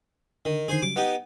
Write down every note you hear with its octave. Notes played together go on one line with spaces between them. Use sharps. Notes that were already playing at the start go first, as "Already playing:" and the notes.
D3 D#3
D3 D#3 G#4 C5 G#5
C#3 F#3 G3 D6
B3 D#4 G4 F#5